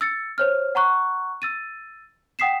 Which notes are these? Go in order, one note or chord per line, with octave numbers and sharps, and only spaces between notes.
E6 A6 C#7
C5 C#5 F6
F#5 A#5 C#6 F#6
E6 A6 D#7
F#5 G5 D#6 B6 C7 E7